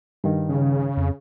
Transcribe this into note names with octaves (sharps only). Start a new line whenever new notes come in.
G2 D#3
C#3
F2